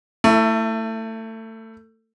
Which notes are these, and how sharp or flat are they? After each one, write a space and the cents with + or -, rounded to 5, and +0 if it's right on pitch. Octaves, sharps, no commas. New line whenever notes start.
A3 +25 E4 +0